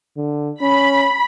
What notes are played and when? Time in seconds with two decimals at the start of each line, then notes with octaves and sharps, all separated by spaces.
0.17 D3
0.61 C#4 B5